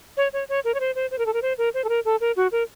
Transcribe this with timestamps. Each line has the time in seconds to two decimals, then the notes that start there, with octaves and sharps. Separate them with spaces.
0.17 C#5
0.33 C#5
0.49 C#5
0.64 A#4
0.74 C#5
0.80 C5
0.95 C5
1.11 C5
1.18 A#4
1.26 A4
1.33 A#4
1.42 C5
1.58 A#4
1.74 C5
1.84 A4
1.89 A#4
2.05 A4
2.21 A#4
2.36 F#4
2.52 A#4